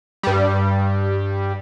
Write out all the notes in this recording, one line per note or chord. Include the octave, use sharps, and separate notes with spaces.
G2 G3